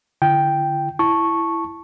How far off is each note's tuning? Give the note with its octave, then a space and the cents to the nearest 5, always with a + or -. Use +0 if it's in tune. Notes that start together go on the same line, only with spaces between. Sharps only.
D3 +0 E4 +45 G5 +0
E4 +15 A5 +0 C#6 -5